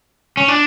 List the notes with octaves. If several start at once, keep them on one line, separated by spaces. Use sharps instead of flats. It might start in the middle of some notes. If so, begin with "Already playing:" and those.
C#4
D4